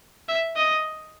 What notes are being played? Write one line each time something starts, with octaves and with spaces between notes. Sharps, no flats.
E5
D#5